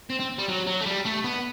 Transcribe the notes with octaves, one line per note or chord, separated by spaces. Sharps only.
C4
C4
G3
F#3
F#3
A3
G3
A3
B3